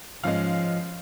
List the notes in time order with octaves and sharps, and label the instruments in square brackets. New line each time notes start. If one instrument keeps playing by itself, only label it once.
[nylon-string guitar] G#2 F3 C#4 [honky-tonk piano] G#3 F5